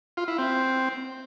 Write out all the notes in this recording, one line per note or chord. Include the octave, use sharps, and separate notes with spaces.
F4
E4
C4